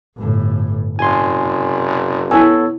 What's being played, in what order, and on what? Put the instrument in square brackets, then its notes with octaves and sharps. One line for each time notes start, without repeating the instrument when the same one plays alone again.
[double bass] G1 A2
[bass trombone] F#1 [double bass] C3 [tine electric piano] G#5 C6
[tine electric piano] B3 A4 C#5 [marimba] E4 G#5